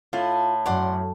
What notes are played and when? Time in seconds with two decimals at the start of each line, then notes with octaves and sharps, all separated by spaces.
0.13 A2 F4
0.66 F#2 D5 F#5 C6